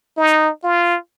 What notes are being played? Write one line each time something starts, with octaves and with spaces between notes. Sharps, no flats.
D#4
F4